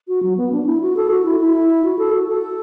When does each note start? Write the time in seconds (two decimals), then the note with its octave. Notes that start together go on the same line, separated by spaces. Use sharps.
0.08 F#4
0.23 F#3
0.37 B3
0.52 D4
0.66 E4
0.81 F#4
0.96 A4
1.11 F#4
1.25 E4
1.40 E4
1.84 F#4
1.99 A4
2.13 F#4
2.28 A4